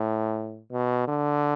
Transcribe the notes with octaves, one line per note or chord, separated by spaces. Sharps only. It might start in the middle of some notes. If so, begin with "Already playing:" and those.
Already playing: A2
B2
D3